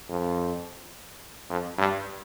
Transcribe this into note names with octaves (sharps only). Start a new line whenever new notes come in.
F2
F2
G2